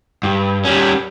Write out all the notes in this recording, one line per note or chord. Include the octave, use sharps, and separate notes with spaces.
G2
G3 C#4